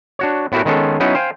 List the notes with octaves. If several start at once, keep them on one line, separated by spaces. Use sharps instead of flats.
D4 F#4 C#5
A2 B3 E4 F#4 G4 A#4
D#3 G#3 B3 C#4 A4
F#3 B3 C#4 D#4 E4
C5 F5 G5 G#5